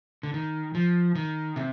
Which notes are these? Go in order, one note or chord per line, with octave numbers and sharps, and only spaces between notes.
D3
D#3
F3
D#3
C3